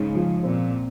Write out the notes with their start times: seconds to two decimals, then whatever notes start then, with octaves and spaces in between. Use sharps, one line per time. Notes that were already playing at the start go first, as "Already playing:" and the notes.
Already playing: G#2 C#3
0.15 F3
0.43 A#2 C4